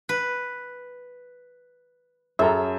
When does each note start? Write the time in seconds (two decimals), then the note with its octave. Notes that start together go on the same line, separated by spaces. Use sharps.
0.09 B4
2.39 F#2 G#4 A4 E5 A#5